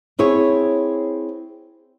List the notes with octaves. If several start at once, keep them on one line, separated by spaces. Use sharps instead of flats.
C4 E4 G#4 C#5